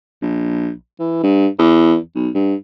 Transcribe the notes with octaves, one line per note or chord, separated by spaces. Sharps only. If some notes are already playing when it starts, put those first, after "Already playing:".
A#1
E3
G2
E2
B1
G2